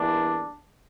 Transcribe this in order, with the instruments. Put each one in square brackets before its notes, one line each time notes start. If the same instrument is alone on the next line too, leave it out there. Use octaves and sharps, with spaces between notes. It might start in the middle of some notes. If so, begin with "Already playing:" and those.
Already playing: [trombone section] E2 E3 G3 A#3 D4